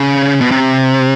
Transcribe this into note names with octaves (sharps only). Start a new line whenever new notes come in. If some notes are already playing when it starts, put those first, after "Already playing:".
Already playing: C#3
B2
C3